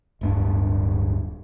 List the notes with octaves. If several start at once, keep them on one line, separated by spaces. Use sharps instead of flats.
D1 G2 D4